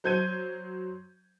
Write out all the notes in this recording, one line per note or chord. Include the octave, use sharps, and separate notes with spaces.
F#3 C5 G6 G#6 D#7